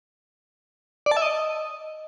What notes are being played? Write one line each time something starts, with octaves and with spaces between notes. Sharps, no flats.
D5
A5
E5
D#5